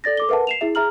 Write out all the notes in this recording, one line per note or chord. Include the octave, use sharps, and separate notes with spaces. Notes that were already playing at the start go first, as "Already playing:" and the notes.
A4 D5 A6 A#6
A4 D6 G7
A#4 B4 E5 F#5 A5
C7 E7 F7
E4 G#4 E5
G#4 E5 A#5 F6 F#7